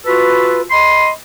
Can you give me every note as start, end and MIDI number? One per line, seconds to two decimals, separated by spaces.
0.06 0.62 65
0.06 0.62 66
0.06 0.62 69
0.06 0.62 71
0.71 1.10 75
0.71 1.10 83
0.71 1.10 84